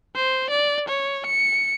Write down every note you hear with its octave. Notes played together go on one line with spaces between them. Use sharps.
C5
D5
C#5
C#7